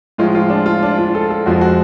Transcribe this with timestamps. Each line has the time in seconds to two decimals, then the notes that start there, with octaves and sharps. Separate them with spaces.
0.18 A2 F3 G#3 F4
0.35 F4
0.50 D4
0.66 F4
0.83 D4
0.98 F4
1.15 A4
1.31 A4
1.46 F2 F3 G#3 F#4
1.61 F#4